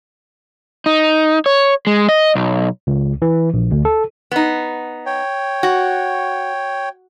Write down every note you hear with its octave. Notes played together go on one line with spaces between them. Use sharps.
D#4
C#5
G#3
D#5
B1
C#2
E3
A#1
D2
A4
B3 D#4
C#5 G5
F#4